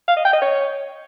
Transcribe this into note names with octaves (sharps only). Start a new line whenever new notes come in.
F5
D#5
G5
D#5
C#5